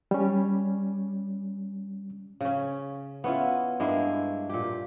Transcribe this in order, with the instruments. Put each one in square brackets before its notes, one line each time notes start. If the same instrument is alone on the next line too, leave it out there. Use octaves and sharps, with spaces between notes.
[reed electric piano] G3 C#4
[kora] C#3 C#4
B3 C#4 E4 F4
G2 G#3 A#3 E4
A#2 G4